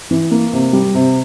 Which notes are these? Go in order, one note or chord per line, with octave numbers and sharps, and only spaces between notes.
E3
A#3
C3
G3
C3